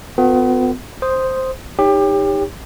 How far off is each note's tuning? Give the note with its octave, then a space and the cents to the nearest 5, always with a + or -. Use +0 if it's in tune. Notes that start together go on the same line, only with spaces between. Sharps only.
B3 +35 F4 +45 A#4 -45
C5 +0 D#6 +0
D#4 +0 G4 +25 C#5 +0